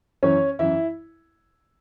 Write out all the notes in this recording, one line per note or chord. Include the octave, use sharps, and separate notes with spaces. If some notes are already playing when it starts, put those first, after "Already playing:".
F#2 E3 C#4 C#5
F#2 E3 E4 E5